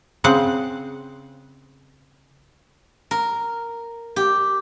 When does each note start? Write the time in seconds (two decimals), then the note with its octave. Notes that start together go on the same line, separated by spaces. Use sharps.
0.24 C#3 C4 F#5
3.11 A#4
4.16 G4